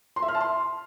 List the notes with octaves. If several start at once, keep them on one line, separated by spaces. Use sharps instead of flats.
C6
E5
F6
A5
C6